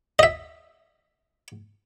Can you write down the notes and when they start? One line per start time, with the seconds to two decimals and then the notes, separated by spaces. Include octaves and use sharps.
0.19 D#5 E5